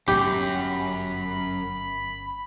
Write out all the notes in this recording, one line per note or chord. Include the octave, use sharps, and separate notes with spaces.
G1 F#2 C#4 G4 B5